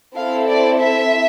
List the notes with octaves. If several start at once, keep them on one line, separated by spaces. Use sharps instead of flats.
C4 E4 A4 F5
D5
E5